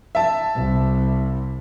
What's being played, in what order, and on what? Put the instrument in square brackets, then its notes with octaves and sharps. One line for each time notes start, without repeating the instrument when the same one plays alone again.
[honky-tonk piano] E5 A5
[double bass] C2